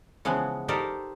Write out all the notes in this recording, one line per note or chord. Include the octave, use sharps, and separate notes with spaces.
C#3 E3 F3 G#3 B3
D#4 G4 A4 A#4 C5 D5